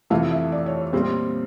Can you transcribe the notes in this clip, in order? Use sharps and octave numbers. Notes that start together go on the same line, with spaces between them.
F2 C3 E3 A3 F5
E5
D5
C#5
A#2 G3 C4 F4